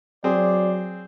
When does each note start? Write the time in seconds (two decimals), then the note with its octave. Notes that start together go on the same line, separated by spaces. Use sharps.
0.24 F#3 C4 G#4 D5